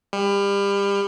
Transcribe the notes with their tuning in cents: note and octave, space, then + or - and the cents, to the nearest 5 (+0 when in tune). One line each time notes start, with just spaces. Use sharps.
G3 +30